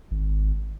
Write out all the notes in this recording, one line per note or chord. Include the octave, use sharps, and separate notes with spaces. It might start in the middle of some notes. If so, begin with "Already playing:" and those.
G#1